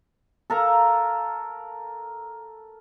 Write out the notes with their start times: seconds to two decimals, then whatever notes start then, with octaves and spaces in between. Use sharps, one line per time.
0.50 A4 A#4 F5 A#5